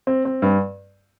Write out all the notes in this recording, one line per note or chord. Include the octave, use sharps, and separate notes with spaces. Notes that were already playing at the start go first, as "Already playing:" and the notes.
C4
C4
G2